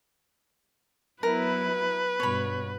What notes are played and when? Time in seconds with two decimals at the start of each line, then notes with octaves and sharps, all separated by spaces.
1.23 F#3 B3 E4 A#4 B4
2.20 G2 B2 C#5 B5